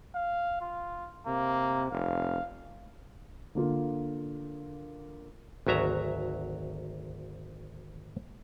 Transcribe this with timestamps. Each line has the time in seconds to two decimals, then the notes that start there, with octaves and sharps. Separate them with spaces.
0.15 F5
0.61 F4
1.27 C3 A#3
1.92 F1 F5
3.55 D3 A#3 F4
5.67 G#1 D2 F#3 E5 A#5